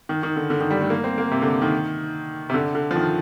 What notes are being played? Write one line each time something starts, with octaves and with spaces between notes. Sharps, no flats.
D#3
D#3
D3
D3
D#3
G3
A3
A#3
C4
A#3
C3
D3
D#3
C3
D3
D3
F3
D#3